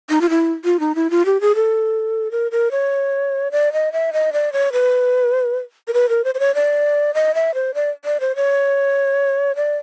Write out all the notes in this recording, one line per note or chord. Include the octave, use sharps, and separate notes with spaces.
D#4
F4
E4
F4
D#4
E4
F4
G4
G#4
A4
A#4
A#4
C#5
D5
D#5
E5
D#5
D5
C#5
B4
A#4
B4
A#4
C5
C5
C#5
D5
D#5
E5
C5
D5
D5
C5
C#5
D5